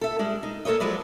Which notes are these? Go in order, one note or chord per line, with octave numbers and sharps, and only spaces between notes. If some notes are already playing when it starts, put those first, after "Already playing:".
A4 E5
G3 G#3 D4
D#4
A#3 A4 B4 C#5 D#5
F3 F#3 G#3 B4 D5